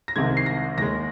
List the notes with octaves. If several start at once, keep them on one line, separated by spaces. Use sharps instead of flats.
A#6
C2 C3 D#3 G#3 G#6
C7
A#6
D#2 D#3 G#3 A#6